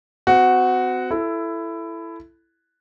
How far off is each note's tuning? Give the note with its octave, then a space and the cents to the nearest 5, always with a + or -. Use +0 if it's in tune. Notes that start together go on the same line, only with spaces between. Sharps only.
C4 -40 F#4 +0
E4 +15 A4 +0